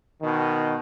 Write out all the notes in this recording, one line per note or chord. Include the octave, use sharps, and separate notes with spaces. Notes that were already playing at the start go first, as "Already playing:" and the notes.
B2 D#3